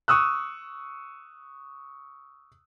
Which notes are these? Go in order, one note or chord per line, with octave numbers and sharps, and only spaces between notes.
C#6 D#6 E6 F#6